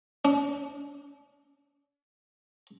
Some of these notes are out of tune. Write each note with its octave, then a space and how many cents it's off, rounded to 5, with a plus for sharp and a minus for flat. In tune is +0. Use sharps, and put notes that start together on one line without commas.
D4 -45